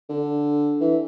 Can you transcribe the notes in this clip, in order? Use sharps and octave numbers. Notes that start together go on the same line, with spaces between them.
D3
E3